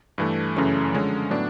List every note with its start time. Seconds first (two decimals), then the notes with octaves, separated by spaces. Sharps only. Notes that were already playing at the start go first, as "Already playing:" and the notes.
0.18 G2 E3 A3
0.56 F#2 C#3 E3 A3 C#4
0.93 D3 F3 G#3 C#4
1.31 A2 F#3 B3 D4